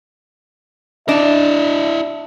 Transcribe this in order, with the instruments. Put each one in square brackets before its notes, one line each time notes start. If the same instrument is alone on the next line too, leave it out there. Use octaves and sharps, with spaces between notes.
[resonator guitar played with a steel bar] D4 [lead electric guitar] E4 D#5 [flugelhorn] E5